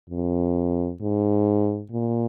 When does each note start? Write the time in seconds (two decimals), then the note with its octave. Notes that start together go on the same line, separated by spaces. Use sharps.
0.10 F2
1.01 G#2
1.91 A#2